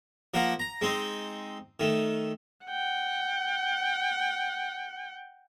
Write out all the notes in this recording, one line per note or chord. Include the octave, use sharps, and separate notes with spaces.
F3 A#3 A#4 F#5
A#5
G#3 C4 D#4
D#3 A3
F#5 G5